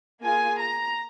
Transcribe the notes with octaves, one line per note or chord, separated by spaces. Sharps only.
A#3 F4 G#4 G#5
A#5